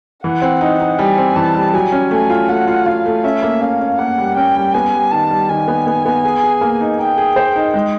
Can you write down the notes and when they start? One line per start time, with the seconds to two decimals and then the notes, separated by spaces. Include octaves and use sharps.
0.24 E3 F#5
0.42 C4
0.61 D#4
0.80 D#4
0.98 G3 G#5
1.18 C4
1.36 E3 A5
1.55 G3
1.74 F#3 G#5
1.92 C#4
2.11 A3 G#5
2.30 F4
2.49 A3 F#5
2.68 F4
2.86 F4 F5
3.06 A3
3.24 C#4 E5
3.43 A#3
3.61 C#4 F5
3.80 C#4
3.98 A#3 F#5
4.18 G3
4.36 C#4 G5
4.55 G3
4.74 B3 G#5
4.93 G3
5.11 D#3 A5
5.31 G3
5.49 D#3 G#5
5.68 B3
5.87 B3
6.06 B3
6.25 G#4
6.44 G#4
6.61 A#3
6.81 D#4
6.99 D#4 G5
7.18 G#4
7.36 C5
7.56 D#4
7.74 G#3